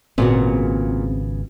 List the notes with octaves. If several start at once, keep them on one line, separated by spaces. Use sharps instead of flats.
G#1 A#2 C#3 B3 C4 F#4